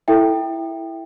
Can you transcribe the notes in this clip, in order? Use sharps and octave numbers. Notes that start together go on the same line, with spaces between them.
E4 A4 E5 G5